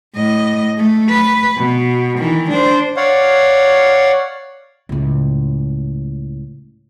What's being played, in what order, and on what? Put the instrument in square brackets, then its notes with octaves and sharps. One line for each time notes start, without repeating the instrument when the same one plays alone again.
[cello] A2 D#5
A3
B4
B2
D#3 E3
D4 C5
[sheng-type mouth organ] C#5 D5 F5 F#5
[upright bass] C#2 A2